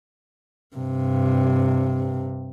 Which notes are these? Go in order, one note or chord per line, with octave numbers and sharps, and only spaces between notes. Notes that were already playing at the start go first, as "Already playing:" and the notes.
G2 C3